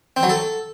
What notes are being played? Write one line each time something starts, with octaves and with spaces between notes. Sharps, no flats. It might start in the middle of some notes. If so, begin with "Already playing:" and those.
C4
F#3
A4